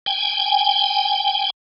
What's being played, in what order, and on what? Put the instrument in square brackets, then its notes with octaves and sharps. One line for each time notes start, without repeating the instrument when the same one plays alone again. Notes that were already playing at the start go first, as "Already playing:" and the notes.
[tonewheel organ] G5 G#5